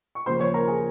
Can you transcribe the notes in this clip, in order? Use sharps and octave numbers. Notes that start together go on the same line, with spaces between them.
C#6
D#2 C#3 F3 C5 C6
C#5 C#6
A#4 A#5
G#4 G#5